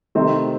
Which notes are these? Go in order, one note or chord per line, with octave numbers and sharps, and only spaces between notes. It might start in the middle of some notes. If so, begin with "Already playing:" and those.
C3 D#3 A3 C4